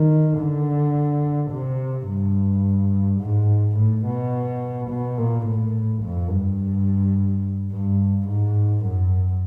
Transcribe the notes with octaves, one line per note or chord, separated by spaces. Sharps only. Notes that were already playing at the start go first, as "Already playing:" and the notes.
Already playing: D#3
D3
C3
G2
G#2
A2
B2
B2
A#2
A2
F2
G2
G2
G#2
F#2